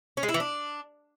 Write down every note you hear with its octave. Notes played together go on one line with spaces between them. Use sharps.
C#4
G#3
E4
E3
D4